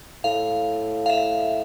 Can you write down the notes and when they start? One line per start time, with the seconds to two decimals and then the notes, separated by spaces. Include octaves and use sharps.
0.24 A2 F5
1.06 F5
1.10 E5